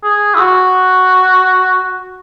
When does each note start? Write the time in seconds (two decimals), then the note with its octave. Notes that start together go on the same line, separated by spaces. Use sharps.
0.03 G#4
0.34 E4
0.39 F#4